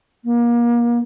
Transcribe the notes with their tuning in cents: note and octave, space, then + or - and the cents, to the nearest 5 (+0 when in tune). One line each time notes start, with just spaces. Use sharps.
A#3 +30